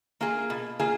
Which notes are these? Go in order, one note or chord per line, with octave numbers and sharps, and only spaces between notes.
A#3 F4 G#4
B2
A#3 F4 G#4